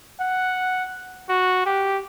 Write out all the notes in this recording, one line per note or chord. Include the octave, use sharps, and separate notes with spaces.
F#5
F#4
G4